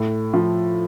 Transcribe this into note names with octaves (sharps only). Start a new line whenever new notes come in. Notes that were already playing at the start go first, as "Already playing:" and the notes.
Already playing: A2
F3